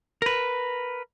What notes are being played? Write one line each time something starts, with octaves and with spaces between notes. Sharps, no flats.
A#4 B4